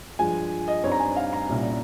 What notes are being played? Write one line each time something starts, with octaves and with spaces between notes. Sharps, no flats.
G2 F3 G#3 G#5
D#5
G2 G3 C4 D#4 C#5
A#5
G#5
F5
A#5
C2 A#2 G3 C#4